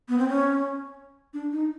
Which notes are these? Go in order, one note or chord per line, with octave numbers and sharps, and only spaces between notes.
B3
C4
C#4
D4
D#4